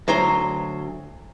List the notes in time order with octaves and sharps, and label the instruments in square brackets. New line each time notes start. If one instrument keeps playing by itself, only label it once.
[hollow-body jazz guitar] D2 F#3 C5 A#5 C6